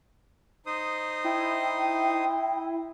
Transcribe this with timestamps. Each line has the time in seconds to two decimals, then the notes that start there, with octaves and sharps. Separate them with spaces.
0.66 D#4 C5 D#6
1.24 E4 G5